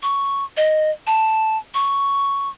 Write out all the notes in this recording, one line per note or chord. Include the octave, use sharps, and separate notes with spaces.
C#6
D#5
A5
C#6